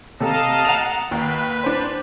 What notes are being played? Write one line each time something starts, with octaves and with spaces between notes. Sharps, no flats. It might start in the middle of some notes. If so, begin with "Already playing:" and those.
C3 A4 D#5 F5 A5 A#5
F#5 A#5 F7
D#2 B4
D4 C5